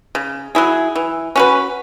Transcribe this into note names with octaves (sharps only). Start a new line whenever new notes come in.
C#3
F#3 E4 G#4
E3
C#4 F#4 B4